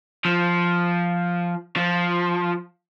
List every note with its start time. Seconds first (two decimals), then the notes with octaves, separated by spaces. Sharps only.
0.25 F3
1.76 F3